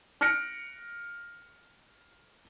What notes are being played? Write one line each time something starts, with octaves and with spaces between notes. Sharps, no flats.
F6 F#6 A#6 C#7 D7